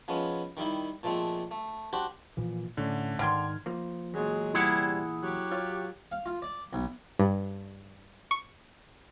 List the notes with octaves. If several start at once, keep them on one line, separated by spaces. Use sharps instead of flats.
F3 G#3 B3 C#4
D#3 G3 D#4 E4
A#2 F3 G#3 A3 C4
A3
D4 F#4 G4 C5
A#2 E3 F3
A2 D3 A3 C#4
G#2 D3 D#3 G5 C6 F6 G#6
F3 A#3
E2 A#2 F#3 G#3 G#4
C3 G3 E4 G#4 F#5
F#3 G4
F4 C#5
F5
F4
D5
B1
G2
C#6